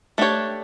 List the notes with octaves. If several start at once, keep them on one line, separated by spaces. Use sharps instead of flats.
A3 D4 G4 C#5